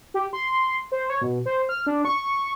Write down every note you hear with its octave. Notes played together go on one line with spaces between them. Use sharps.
G4
C6
C5
C#5
B2
C5
F6
D4
C#6